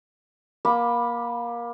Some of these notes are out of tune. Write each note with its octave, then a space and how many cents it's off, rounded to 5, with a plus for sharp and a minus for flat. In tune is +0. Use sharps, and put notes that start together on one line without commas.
A#3 +20 B5 -10 D6 +15